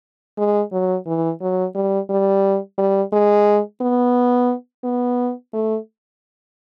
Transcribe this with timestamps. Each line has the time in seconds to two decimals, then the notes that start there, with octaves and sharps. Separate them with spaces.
0.38 G#3
0.72 F#3
1.06 E3
1.41 F#3
1.75 G3
2.10 G3
2.78 G3
3.12 G#3
3.81 B3
4.84 B3
5.53 A3